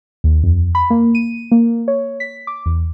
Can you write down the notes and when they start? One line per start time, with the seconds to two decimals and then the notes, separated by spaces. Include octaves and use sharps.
0.24 D#2
0.44 F2
0.75 B5
0.90 A#3
1.15 D#7
1.52 A#3
1.88 C#5
2.20 B6
2.47 D6
2.66 E2